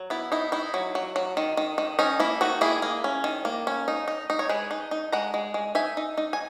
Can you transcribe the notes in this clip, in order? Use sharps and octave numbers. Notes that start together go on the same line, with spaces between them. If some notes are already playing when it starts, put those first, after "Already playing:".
Already playing: F#3
B3 E4
D#4 E4
D#4 E4
F#3
F#3
F#3
D#3
D#3
D#3
C#4 D#4
A#3 E4
D#3 D#4 F#4
A#3 E4 G#4
A#3
C#4
D#3
A#3
C#4
D#4
D#4
D#4
C#5
G#3 G#4 B4
D#4
D#4
G#3 F#5 A#5
G#3
G#3
D#4 E5 G#5
D#4
D#4
G#5